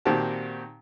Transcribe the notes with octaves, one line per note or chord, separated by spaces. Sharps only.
A#2 D#3 C4 F#4 G4 A5